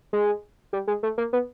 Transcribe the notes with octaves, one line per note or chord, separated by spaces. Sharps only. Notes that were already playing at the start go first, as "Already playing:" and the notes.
G#3
G3
G#3
A3
A#3
B3